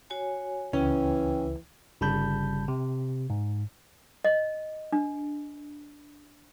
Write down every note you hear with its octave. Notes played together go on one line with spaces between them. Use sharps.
F#4 C#5 G#5
C#2 E3 C#4 G5
G1 C#3 G3 A5 B5 G6
C3
G#2
D#5
D4